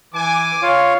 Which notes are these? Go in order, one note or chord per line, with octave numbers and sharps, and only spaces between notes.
E3 G#5 D6
F4 C#5 F5